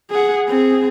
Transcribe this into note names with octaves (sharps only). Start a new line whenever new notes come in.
G#4 F#5
C4 G#4